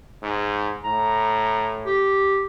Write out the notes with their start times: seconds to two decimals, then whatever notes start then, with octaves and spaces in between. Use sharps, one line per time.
0.23 G#2
0.84 A2 A#5
1.86 G4